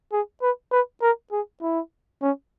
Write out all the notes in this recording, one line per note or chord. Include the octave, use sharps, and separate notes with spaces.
G#4
B4
B4
A#4
G#4
E4
C#4